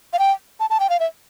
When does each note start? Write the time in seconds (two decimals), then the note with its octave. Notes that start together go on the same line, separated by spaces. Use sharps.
0.13 F5
0.19 G5
0.60 A5
0.70 A5
0.80 G5
0.90 F5
1.00 E5